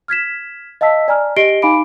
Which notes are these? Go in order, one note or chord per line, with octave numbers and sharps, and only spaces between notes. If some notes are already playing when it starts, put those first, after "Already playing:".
F6 G#6 B6 E7
D#5 F5 A5 E6 B6
D5 G#5 A#5 F6
G4 D#5 A#6 C7 D7 G7
D#4 F5 G#5 B5 D6 D7